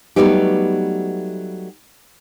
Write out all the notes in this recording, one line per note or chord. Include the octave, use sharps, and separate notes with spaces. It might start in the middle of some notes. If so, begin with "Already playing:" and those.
F#3 G3 A3 B3 D#4 G4